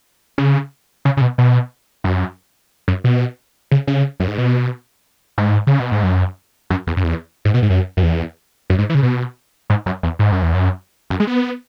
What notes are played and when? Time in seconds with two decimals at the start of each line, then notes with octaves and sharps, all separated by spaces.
0.38 C#3
1.05 C#3
1.17 C#3
1.21 B2
1.38 B2
2.04 F#2
2.88 F#2
3.04 B2
3.71 C#3
3.87 C#3
4.20 F#2
4.28 G#2
4.38 B2
5.38 G#2
5.67 C#3
5.80 B2
5.92 G#2
6.03 F#2
6.70 F#2
6.87 E2
6.97 F#2
7.04 E2
7.45 G#2
7.54 B2
7.62 G#2
7.70 F#2
7.97 F#2
8.03 E2
8.70 F#2
8.78 G#2
8.90 E3
8.95 C#3
9.03 B2
9.70 G#2
9.86 F#2
10.03 E2
10.19 G#2
10.32 F#2
10.42 E2
10.54 F#2
11.10 F#2
11.20 G#3
11.27 B3